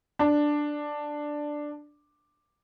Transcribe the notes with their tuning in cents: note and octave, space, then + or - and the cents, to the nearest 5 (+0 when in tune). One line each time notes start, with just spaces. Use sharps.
D4 +5